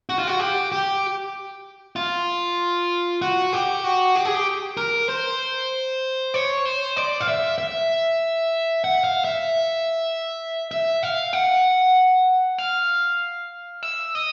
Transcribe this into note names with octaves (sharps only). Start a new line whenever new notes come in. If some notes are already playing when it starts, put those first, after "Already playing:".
F#4
F4
F#4
G4
G4
F4
F#4
G4
F#4
G4
G#4
G4
A#4
C5
C#5
C5
D5
F5
E5
E5
F#5
F5
E5
E5
F5
F#5
F5
E5
D#5